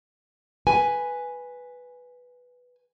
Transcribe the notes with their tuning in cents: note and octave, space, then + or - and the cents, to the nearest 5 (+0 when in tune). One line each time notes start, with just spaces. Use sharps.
B4 +0 G#5 +0